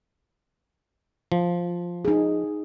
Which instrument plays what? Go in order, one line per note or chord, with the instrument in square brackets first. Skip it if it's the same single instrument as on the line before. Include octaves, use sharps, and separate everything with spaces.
[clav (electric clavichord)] F3
[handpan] D#4 G#4